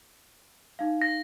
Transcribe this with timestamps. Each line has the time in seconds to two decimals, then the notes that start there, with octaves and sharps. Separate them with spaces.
0.79 D#4 F5
1.02 A#6